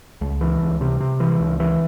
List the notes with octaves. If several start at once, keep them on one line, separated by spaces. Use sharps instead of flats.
C#2
E3
C#2
C3
C3
E3
C#2
E3